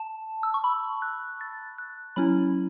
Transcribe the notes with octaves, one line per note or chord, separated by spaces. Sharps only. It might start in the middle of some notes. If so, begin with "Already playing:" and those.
Already playing: A5
E6
C#6
B5
F#6
A6
F#6
F#3 C#4 E4 B5